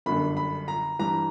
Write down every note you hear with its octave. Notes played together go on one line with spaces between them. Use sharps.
G1 F#2 D3 G3 B5
B5
A#5
G2 E3 G3 A#5